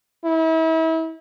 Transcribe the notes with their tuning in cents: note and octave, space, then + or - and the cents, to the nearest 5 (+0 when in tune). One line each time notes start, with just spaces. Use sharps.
E4 -35